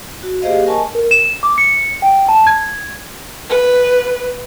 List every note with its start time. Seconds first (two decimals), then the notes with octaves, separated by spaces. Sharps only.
0.23 F#4
0.42 A#3 G4 G#4 C5 D#5 F5
0.66 A#4 D#5 G#5 A5 C#6
0.95 A#4
1.11 E7
1.43 D6
1.58 C#7
2.02 G5
2.29 A5
2.47 G#6
3.49 B4